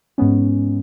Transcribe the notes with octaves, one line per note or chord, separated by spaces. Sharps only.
G#2 G#3 B3 C#4